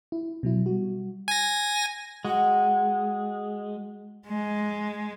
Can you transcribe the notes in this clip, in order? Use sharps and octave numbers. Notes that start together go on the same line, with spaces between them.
E4
B2 F#3 E4
G3 F#4
G#5 A#6
G#3 F#4
G#3